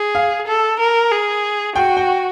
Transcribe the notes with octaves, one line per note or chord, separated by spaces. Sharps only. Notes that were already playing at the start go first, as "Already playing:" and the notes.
Already playing: G#4
F5
A4
A#4
G#4
F#4 G5
G5